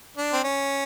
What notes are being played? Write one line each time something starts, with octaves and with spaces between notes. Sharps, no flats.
D4
C4
C#4